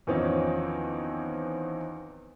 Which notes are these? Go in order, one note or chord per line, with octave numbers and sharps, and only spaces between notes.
E2 D#3 F3 C4 C#4 D#4